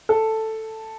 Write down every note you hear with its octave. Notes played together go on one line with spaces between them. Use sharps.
A4